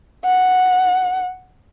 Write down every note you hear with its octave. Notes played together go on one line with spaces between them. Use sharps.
F#5